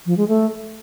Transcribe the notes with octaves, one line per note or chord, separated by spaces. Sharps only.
F3
G#3
A3